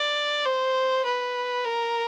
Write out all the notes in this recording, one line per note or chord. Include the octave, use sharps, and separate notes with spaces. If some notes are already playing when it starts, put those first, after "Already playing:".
Already playing: D5
C5
B4
A#4